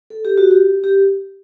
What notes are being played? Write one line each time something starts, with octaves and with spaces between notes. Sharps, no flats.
A4
G4
F#4
G4
G4